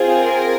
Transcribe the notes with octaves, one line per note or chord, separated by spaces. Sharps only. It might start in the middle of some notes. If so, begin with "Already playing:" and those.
Already playing: C4 F4 G#4
A#4